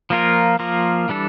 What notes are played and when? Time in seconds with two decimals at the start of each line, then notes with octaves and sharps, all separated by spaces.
0.10 F3 A#3 F4 A#4
0.59 F3 A#3 F4 A#4
1.09 E3 G3 D4 A4